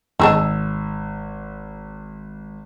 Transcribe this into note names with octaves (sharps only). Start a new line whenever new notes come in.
G#1 D#4 G#4 A5 E6